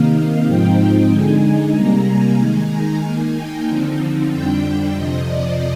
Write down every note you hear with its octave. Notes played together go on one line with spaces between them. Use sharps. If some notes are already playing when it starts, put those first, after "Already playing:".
Already playing: C3 D#3 A#3 D#4 F5
G#2 F3 C4 D#4 G5
D3 G#3 D#4 G#5
G#5
C3 G3 A#3 A#5
G#5
D#3 G#3 D#4
A#5
D#3 A#3 D#4 G#5
G5
D3 F3 C4 D#4
F2 D3 G3 D4 G5
F2 C3 F3 D#5
D5